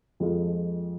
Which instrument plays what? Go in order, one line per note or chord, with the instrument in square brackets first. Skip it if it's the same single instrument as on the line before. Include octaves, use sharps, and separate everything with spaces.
[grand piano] F2 F3 G#3 F4